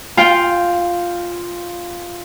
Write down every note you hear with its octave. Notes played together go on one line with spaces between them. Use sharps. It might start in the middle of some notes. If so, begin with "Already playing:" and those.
F4 G5